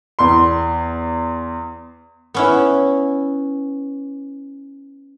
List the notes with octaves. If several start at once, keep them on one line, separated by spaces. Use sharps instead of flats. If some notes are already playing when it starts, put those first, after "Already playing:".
E2 C6
B3 C#4 E4